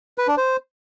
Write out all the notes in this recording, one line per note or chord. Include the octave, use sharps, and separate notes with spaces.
B4
D4
C5